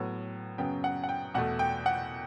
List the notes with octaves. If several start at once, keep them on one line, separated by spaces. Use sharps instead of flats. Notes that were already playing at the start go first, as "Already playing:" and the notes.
Already playing: A2 F#3 B3
F#2 C#3 F#3 B3 G5
F#5
F#5
G5
E2 B2 A3 F#5
G5
F#5